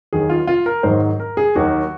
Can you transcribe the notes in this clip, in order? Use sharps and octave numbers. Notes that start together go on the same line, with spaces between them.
D#2 D#3 F#3 G#4
F4
F4
A#4
G#2 D#3 F#3 C5
A#4
G#4
D#2 D#3 F#3 F#4